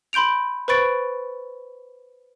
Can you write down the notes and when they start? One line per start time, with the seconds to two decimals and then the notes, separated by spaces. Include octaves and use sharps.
0.13 B5 C6 G6 D7 F7
0.68 B4 C5 B5 C#6 A6 D7